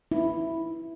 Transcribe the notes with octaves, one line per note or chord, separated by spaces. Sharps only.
E4